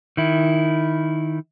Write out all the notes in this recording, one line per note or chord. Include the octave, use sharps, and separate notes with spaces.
D#3 E4